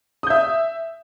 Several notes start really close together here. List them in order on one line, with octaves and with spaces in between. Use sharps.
D#6 G6 E5